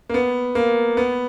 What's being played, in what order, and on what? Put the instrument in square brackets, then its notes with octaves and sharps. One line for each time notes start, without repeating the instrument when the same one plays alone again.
[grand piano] A#3
B3
A#3
B3